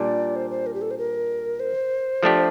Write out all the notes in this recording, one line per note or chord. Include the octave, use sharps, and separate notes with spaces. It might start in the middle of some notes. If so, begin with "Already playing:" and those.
Already playing: A#2 G3 D4 D5
C5
C5
A#4
G4
A4
C5
A#4
C5
F3 A3 D4 G4